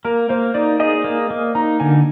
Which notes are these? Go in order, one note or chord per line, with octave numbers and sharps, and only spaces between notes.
A#3 A#4
A#3 C5
D#4 D5
G#4 D#5
A#3
A#3
D#4 A#5
D3 G#5